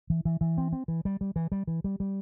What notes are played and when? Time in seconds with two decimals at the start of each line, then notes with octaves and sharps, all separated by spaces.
0.10 E3
0.25 E3
0.41 E3
0.58 C4
0.73 C4
0.88 E3
1.05 G3
1.21 G3
1.36 E3
1.52 G3
1.67 E3
1.84 G3
2.00 G3